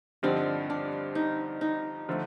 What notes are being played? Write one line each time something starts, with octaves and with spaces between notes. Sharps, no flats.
G2 D3 F3 C4 D4 D#4
D4
D#4
D#4
D3 F3 A3